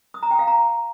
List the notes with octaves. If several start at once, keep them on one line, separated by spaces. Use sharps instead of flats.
D#6
A#5
G5
F5
A#5